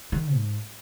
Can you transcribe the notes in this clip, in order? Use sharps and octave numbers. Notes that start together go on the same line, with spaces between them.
D#3
G#2